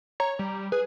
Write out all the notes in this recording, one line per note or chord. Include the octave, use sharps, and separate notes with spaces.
C#5 A#5
G3
G#4 B4